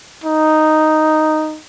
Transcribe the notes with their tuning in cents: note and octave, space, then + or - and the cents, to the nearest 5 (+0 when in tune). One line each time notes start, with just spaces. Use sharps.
D#4 -5